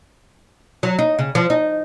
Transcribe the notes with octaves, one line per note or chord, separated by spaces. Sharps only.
F#3
D#4
C#3
F3
D#4